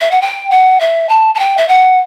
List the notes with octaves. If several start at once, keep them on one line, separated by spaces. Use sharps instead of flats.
E5
F#5
G5
F#5
E5
A5
A5
G5
E5
F#5